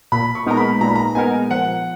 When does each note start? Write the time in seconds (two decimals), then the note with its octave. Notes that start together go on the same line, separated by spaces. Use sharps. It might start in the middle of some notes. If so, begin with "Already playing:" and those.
0.12 A#2 B5
0.35 C#6
0.46 G#3 B3 D#4 A#4 A#5
0.57 B5
0.81 A#2 A#5
0.88 B5
0.96 A#5
1.15 G#3 B3 D#4 A#4 G#5
1.50 F3 F#5